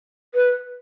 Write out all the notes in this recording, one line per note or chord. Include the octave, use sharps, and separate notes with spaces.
B4